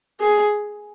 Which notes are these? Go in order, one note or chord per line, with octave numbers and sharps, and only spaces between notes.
G#4